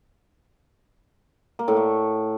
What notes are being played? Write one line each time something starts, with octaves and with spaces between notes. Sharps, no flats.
A#3
A2
A3